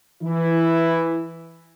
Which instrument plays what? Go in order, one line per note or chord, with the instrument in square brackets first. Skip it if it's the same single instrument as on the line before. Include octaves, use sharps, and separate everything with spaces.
[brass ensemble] E3 E4